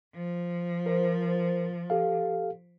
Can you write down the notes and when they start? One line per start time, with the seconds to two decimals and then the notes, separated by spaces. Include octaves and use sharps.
0.15 F3
0.86 A#4 C5
1.90 G4 A4 F5